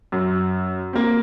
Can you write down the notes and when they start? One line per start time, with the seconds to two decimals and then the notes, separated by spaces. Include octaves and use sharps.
0.12 F#2
0.93 A#3 C4